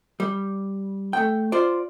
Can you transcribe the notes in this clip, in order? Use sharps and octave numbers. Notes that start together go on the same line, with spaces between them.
G3
A3 G5
F4 C5 D5